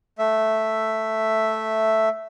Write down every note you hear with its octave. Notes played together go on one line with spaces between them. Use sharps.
A3 E5